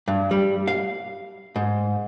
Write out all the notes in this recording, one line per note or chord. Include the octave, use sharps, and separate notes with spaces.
G2
G3
F5
G#2